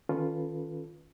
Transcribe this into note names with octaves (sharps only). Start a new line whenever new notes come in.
D#3 C#4 F4 A4 B4